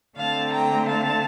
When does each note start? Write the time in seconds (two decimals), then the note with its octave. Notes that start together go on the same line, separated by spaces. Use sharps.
0.17 D3 A3 C4 F5 A5
0.53 G5 A#5
0.88 F5 A5